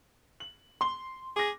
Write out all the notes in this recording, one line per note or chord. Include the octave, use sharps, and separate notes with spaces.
F#7
C6 G7
G#4 D6 A#6